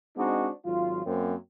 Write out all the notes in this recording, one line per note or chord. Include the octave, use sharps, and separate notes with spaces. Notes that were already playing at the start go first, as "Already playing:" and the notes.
G#3 C4 D4 D#4 F#4
G#1 F#3 F4
F#2 A#3 C4